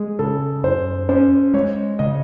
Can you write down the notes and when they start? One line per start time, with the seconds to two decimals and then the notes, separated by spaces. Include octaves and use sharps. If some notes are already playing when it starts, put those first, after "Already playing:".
Already playing: G#3 G#4
0.19 C#3 A4
0.64 F#2 C5
1.09 C#4 C5
1.54 G#3 C#5
1.99 C#3 D#5